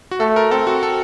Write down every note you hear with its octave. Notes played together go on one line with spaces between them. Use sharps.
F#4
A3 A4
A#4
C4 A4
F#4
A4